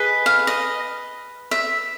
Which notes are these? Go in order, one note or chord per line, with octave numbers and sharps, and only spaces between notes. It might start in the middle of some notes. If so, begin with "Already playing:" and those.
Already playing: G#4 B4 D#5
F5
D#5
E5